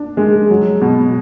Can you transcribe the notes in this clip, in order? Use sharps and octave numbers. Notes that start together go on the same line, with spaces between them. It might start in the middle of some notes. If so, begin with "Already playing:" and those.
Already playing: D4
G#3
F#3
B2